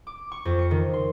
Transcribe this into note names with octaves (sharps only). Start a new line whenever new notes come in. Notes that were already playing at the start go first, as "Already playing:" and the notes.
D6
C#6
F2
C#7
D#3
C6